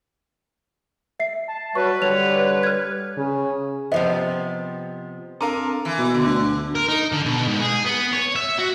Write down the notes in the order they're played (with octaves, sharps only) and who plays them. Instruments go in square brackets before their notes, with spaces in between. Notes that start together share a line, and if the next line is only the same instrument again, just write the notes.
[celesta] E5 C7
[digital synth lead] A5
[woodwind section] F#3 G3 [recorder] B4 [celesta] C#6
[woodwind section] D3 C#5 [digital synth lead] G3 [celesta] F7
[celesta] F6 G#6
[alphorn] C#3
[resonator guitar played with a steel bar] C3 F3 B3 [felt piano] C5 D#5
[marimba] C4 D4 A#5 [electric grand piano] A4 A#4 F5
[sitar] E3
[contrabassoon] B2
[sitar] D3
[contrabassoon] D2
[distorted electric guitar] A#4
D#4
D3
B2
G#2
G#4
B3
C#5
E5
F#4